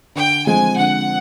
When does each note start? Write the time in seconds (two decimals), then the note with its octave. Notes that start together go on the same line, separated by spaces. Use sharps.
0.15 D3 G5
0.47 F3 G#3 C4 G#5
0.78 D3 F#5